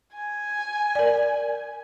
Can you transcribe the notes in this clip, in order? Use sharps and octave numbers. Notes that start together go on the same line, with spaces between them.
G#5
A#4 D5